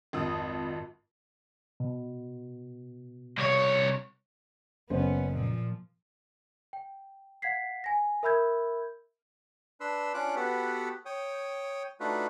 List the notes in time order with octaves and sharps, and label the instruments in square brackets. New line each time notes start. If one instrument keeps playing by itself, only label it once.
[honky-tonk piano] G#1 F2 D#6
[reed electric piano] B2
[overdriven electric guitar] C2 C#5
[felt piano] F#1 C5 [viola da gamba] B3 C#4
[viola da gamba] A#2 F3
[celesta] G5
F5 F#5 G#6 B6 C7
G#5 A#6
A#4 E5 B5 E6 G6 G#6
[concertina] D4 B4 C6 E6
C#4 D4 F4 D6 F#6
B3 F#4 G4 A4 B4
C#5 G5 D#6
A3 D4 D#4 F4 F#4 B4